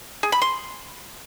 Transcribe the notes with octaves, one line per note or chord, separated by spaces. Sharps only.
G#4
B5
C6